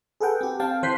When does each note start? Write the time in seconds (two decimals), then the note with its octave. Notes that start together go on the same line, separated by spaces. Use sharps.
0.20 G#4 A4 B4 F#5 G5
0.41 C4 G4
0.60 C4 F5 G5 A5
0.83 E3 C5 F#6 G6 B6 C7